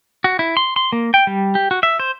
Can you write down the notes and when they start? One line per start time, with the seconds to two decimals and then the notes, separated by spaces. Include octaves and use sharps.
0.24 F#4
0.39 E4
0.57 C6
0.76 C6
0.93 A#3
1.14 G5
1.27 G3
1.55 G4
1.71 F#4
1.83 E5
2.00 C5